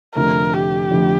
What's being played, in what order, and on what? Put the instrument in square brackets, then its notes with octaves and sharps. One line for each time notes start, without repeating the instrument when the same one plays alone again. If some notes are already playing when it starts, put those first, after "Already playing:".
[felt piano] F1 F2 D3 A3 [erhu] A#4
[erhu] G4
[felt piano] F1 F2 D3 A3